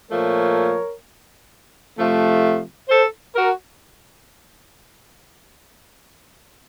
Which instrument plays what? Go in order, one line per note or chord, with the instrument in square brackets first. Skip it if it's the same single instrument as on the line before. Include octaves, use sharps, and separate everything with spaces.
[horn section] A#2 F3 A3 A#4 C#5
C3 F3 A3
A4 C5
F#4 A#4